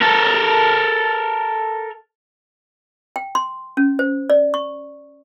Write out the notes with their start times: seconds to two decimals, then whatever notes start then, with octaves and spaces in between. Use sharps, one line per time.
0.01 A4 A#4
3.16 G5
3.35 C6
3.77 C#4
3.99 C5
4.30 D5
4.54 C#6